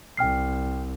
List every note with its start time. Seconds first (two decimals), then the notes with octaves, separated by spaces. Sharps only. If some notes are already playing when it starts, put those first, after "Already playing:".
0.17 C2 G5 F6 C7